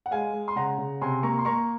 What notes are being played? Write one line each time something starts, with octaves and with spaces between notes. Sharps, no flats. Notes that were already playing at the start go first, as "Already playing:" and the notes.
F#5
G#3 F5 G#5
G#3
C6
C#3 F#5 A#5
C#3
C3 G#5 C6
A#3 A#5 C#6
C6
A#3 A#5 C#6